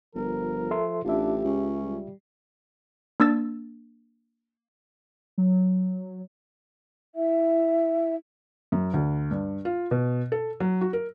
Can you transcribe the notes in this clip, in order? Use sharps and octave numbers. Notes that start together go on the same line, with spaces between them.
G1 F3 A#4
A4 E5 C6
A1 D4 F4 G4 E5
C#2 C#4
G3
A#3 D4 E6 A6
F#3
E4 E5
F#2
D2
G2
F4
B2
A4
F#3
F#4
A#4